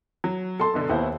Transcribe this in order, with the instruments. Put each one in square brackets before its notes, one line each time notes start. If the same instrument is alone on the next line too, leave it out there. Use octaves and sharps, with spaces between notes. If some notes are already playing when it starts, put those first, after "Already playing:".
[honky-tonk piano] F#3
[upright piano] A4 A5 C6
[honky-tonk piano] F#2 B2 D3
[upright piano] D#2 [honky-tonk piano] B3 E4 C5